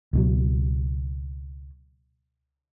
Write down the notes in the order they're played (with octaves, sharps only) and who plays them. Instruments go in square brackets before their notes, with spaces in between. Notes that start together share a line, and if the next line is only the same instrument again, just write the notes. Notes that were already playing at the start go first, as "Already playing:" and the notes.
[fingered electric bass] C#2 B2 F#3